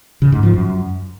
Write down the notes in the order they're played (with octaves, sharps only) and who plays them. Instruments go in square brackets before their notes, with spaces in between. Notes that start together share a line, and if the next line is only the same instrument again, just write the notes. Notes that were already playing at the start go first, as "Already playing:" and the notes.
[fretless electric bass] C#3
G#2
F3
F#2